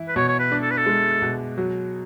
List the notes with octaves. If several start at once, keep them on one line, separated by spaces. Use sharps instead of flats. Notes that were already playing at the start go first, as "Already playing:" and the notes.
Already playing: E3 E4
B4
B2 C#5
C#5
B4
D4
A4
B4
A4
G#3
B2
F#3